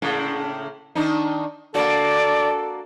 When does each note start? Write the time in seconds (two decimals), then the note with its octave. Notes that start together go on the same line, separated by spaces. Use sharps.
0.02 A2 C#3 A#3
0.95 D#3 D4 D#4
1.75 A#3 D4 F#4 A4 D5